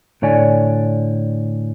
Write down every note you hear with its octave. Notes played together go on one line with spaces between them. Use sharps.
A2 D3 C#5 D5 G#5